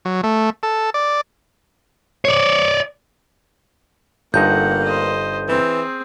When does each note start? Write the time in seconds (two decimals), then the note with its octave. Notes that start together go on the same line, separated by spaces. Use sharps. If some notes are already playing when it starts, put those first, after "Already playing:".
0.05 F#3
0.24 A3
0.63 A4
0.94 D5
2.25 C#5 D5
4.34 G1 G2 A#3 D#4 F#5 G6
4.85 C5 D#5
5.48 E3 C4 G#4